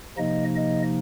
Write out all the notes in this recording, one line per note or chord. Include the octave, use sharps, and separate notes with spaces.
C3 F3 A#3 D#4 D#5
D#5